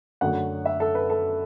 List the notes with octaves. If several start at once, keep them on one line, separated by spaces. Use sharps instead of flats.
F#2 D3 F#3 A3 F#5
E5
A4
B4
A4